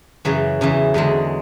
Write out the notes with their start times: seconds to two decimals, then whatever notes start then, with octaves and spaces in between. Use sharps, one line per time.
0.25 F#2 C#3 E3 F#3
0.61 E2 C#3 E3
0.94 E2 D3 F#3 G#3